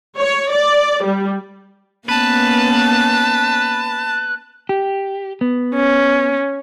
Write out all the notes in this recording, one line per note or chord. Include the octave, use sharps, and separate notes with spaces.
C#5
D5
G3
A#3 B3 C#4 B4 A5
G4
B3
C#4